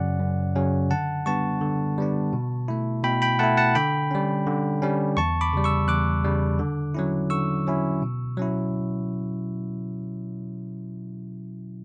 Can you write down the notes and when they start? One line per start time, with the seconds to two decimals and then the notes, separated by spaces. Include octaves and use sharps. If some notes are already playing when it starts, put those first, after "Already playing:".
Already playing: F#2 C#3 F#3 C#4 D5 F#5
0.19 F#2
0.55 C#3 F#3 C#4
0.90 D3 F#5 A5
1.26 G3 B3 D4 A5 C#6
1.61 D3
1.98 G3 B3 D4
2.33 B2
2.68 A3 E4
3.04 B2 G5 B5
3.22 G5 B5
3.39 A3 E4 F#5 A5
3.57 F#5 A5
3.75 D3 G5 B5
4.11 G3 C#4
4.47 D3
4.82 G3 C#4
5.17 E2 A5 C#6
5.41 B5 D6
5.53 C#3 G3
5.64 C#6 E6
5.88 E2 D6 F#6
6.24 C#3 G3
6.59 D3
6.95 F#3 C#4 E4
7.30 D3 C#6 E6
7.67 F#3 C#4 E4
8.02 B2
8.37 F#3 C#4 E4